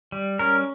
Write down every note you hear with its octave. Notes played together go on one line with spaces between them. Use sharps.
G3
C#4 A#4